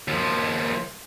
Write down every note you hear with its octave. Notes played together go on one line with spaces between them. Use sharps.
D#2 F3